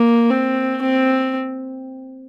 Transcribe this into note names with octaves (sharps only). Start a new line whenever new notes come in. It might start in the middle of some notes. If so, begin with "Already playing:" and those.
Already playing: A#3
C4
C4